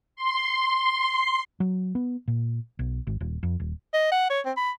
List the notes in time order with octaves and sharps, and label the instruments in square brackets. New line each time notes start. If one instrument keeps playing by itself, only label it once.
[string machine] C6
[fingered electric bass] F#3
B3
A#2
B1
G#1
D#1
F2
D#1
[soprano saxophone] D#5
F#5
C#5
C4
B5